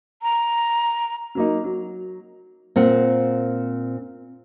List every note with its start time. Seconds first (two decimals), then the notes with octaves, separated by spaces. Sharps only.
0.23 A#5
1.35 F#3 A#3 D#4
1.64 F#3
2.76 A#2 C4 F#5